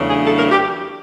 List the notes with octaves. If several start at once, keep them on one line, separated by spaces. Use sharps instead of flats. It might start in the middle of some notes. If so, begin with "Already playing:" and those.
Already playing: E2 C#3 F#3 A3 D4
G#4
A4
A#4
G4